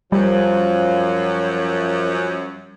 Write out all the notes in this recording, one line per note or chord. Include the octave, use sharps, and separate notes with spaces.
F#2 F3 G3